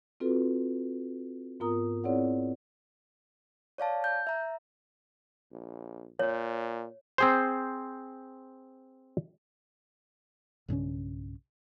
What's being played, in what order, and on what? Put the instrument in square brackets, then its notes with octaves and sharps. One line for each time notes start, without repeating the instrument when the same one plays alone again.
[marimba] C4 F4 F#4 A4 B4
G#2 B3 F4 A#4 A#5 D#6
C4 E4 G#4 C#5 D5 F#5
[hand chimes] C#5 D5 F5 A5
G6
E5 A#5
[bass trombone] A#1
[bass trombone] A#2 [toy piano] C#5
[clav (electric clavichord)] C4 G#4 C5
[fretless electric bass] B1 G2 C#3 C#4